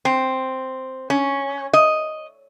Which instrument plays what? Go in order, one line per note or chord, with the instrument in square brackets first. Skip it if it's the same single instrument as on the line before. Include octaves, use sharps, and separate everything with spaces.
[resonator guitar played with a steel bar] C4
C#4
D#5